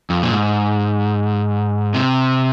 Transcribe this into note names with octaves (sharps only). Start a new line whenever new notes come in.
F2
A#2
G#2
C3